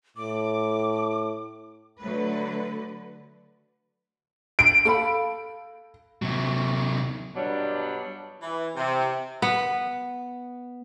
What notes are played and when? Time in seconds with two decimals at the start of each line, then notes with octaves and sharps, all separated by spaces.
0.17 A2 D6
2.00 D3 F#3 A3 B4
4.59 D7
4.85 A4 F5 B5
6.22 C3 F#3
7.36 G2 B2 F#3 G3 D4
8.41 E3
8.75 C3
9.42 B3